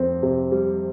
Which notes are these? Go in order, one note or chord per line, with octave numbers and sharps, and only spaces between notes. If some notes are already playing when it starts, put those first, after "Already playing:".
Already playing: F2 C4
C3
G3